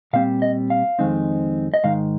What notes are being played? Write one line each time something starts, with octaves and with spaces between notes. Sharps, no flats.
A#2 G3 C4 F5
D#5
F5
F2 D#3 G#3 C4 D#4
D#5
G#2 D#3 G#3 D#4 F5